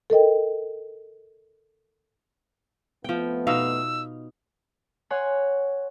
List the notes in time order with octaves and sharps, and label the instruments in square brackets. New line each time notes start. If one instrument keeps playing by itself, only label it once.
[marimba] A4 A#4 D#5 G5
[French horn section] F2 A3 B3 [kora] F3 G5
[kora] B2 D#4 F5 [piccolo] E6
[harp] C#5 F#5 G#5 C6